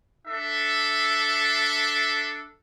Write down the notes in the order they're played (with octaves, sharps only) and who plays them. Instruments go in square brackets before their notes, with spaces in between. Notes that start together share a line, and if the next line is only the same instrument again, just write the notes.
[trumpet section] D4 A4 E5